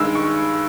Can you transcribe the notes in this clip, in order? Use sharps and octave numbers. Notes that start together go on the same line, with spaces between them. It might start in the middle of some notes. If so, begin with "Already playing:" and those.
Already playing: G2 D#3 G#3 E6
C#6